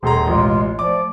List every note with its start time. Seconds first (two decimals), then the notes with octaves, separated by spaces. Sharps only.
0.03 D#1 G#4 A4 A#5 C6
0.27 A1 B2 G#3 F4
0.79 F3 A3 D5 D6